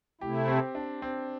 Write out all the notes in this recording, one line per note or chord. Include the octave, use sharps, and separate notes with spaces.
C3 A3 E4 G4
C4
D4
C4